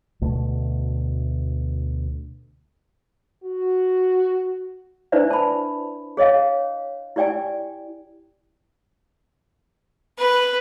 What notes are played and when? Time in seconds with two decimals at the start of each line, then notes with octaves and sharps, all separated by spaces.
0.22 D2 B2 A3
3.43 F#4
5.12 D4 E4 B4 C5 D5 E5
5.30 A5 B5
6.17 G#4 C#5 D#5 F5
7.16 E4 G4 D5 G5 G#5
10.19 B4